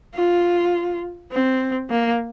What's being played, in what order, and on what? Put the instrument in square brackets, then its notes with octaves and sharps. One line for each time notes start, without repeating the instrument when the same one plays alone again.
[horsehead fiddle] F4
C4
A#3